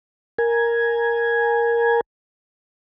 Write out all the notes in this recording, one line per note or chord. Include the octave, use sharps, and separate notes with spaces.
A#4 G#5